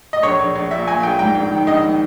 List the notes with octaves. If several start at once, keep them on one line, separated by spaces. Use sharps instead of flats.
D#5
A#1 C#5
A#1
A#1
A#2 E5
A#2 G#5
A#1 G5
G#2 G5
A#1
D#3
A#1 D#5
D#3